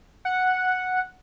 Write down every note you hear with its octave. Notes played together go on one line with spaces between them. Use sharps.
F#5